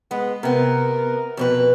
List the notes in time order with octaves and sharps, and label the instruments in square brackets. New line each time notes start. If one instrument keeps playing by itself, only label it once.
[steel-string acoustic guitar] G#3 [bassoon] B3
[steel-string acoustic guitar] C3 B3 [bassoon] A#4
[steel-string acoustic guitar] F2 B2 B4